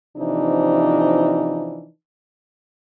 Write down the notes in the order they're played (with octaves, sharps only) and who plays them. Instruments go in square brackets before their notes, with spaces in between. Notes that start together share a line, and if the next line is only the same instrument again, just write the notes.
[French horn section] C3 E3 F3 D4 D#4